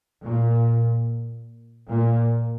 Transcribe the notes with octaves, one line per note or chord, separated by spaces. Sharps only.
A#2
A#2